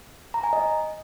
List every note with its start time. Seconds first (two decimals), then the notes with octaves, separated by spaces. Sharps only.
0.34 A#5
0.43 G#5
0.53 D#5